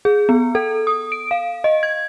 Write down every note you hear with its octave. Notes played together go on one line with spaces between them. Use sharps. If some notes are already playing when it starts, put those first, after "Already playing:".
G#4
B3
A4
D#6
D7
F5
D#5
G#6